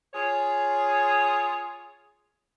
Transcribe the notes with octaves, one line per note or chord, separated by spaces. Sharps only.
F4 G#4 C#5